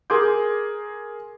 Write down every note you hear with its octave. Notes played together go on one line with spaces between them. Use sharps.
G#4 A#4 C6 D6 G6